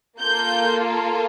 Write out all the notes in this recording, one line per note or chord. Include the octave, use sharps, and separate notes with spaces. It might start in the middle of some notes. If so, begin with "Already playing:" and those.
A#3 F4 A4 G6